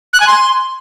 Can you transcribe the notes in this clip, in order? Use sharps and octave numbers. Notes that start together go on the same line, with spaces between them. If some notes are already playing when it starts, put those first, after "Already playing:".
F#6
G#5
C6